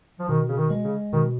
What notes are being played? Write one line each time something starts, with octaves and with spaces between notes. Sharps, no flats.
F3
B2 D#3
C#3
D#3
G#3
C#3
B2 D#3